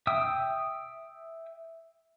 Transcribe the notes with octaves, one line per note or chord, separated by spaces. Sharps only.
E5 G5 D#6